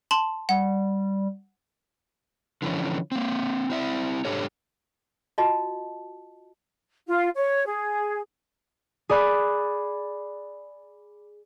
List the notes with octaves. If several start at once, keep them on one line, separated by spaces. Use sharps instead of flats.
A5 C6 F#7
G3 F#5
D3 E3 F3 C#4
A#3 C4
C4 E4 E5
G#2 D4 G4 A4 C#5
F4 F#4 D#5 A5
F4
C#5
G#4
G#4 D5 B5 F#6